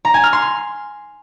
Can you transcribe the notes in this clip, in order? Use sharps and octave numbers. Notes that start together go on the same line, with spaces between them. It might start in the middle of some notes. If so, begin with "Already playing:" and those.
A#5
G#5
F6
C6